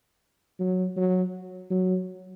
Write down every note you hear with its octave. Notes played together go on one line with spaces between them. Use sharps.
F#3
F#3
F#3